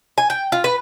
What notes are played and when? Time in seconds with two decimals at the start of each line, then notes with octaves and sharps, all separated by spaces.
0.18 G#5
0.30 G5
0.52 F4
0.64 B4